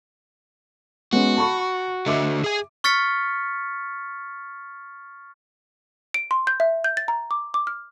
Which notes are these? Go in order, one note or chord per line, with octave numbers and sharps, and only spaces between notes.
G#3 B3 C#4 F#4
A5 B5 C#6
D3 F#4 D#5 E5 D6
G#4 G#5
C#6 F6 A6 B6 C#7
D7
C6
G6
E5
G6
A6
A#5
D6
D6
F6